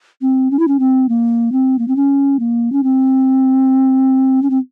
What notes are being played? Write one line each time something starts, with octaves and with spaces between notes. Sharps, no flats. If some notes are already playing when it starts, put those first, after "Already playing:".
C4
C#4
E4
C#4
C4
A#3
C4
A#3
C4
C#4
A#3
C#4
C4
C#4
C4